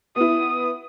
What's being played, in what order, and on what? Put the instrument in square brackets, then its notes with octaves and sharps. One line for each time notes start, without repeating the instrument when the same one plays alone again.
[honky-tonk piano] B3 E4 [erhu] D#6